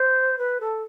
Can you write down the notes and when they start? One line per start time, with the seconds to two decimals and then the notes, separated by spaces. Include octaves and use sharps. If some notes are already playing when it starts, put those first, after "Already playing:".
Already playing: C5
0.38 B4
0.60 A4